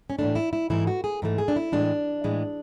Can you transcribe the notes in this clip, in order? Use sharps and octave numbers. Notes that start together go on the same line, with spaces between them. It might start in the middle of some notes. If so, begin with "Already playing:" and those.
C#4
A2 E3 A3 D4
E4
E4
G#2 E3 A3 E4
F#4
G#4
G#2 E3 A3
G#4
D4
E4
A2 E3 G#3 D4
A2 E3 G#3